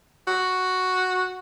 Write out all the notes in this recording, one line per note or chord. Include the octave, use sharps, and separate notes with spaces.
F#4